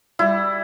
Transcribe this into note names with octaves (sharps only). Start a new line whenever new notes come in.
G3 E4